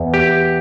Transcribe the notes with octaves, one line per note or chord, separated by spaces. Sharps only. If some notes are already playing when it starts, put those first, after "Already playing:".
Already playing: E2
G4